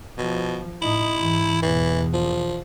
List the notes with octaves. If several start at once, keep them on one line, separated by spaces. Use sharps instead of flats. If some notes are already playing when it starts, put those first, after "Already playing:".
B2 F3
A2 D#4 E4
G#2 E3
E2 B2 E3
F3